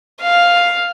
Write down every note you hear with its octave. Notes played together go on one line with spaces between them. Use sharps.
F5